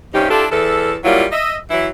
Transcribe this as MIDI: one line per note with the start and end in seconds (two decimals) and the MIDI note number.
0.14 0.29 43
0.14 0.29 48
0.14 0.29 61
0.14 0.29 63
0.14 0.29 67
0.30 0.46 62
0.30 0.46 64
0.30 0.46 65
0.30 0.46 67
0.30 0.46 69
0.52 0.97 40
0.52 0.97 52
0.52 0.97 69
1.05 1.24 54
1.05 1.24 55
1.05 1.24 58
1.05 1.24 64
1.05 1.24 65
1.32 1.57 75
1.32 1.57 76
1.70 1.88 52
1.70 1.88 54
1.70 1.88 64